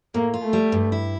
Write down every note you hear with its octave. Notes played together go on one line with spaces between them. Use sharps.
A2 A#3
F4
A3
G3
G2
E4